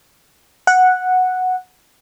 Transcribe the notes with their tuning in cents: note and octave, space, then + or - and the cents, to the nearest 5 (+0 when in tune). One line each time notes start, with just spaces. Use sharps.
F#5 -5